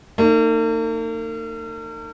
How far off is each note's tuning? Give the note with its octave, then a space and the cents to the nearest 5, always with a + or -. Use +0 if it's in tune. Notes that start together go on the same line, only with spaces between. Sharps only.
A#3 -45 D#4 -10